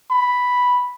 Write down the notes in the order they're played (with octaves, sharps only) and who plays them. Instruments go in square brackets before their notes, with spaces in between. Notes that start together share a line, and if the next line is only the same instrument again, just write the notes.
[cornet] B5